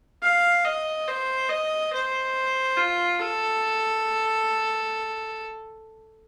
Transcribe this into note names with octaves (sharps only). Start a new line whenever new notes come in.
F5
D#5
C5
D#5
C5
F4
A4